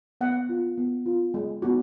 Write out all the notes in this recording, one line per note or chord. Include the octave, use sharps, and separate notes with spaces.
B3 F#5
F4
B3
F4
G#3
B3 D#4 F#4